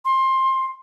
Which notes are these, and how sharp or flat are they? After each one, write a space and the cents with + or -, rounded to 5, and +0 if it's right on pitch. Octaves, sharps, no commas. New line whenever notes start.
C6 +20